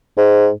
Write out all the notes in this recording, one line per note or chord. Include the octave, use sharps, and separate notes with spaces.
G#2